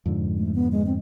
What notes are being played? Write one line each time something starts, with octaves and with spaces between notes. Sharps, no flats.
F2 G#2 D3
A3
B3
G#3
C4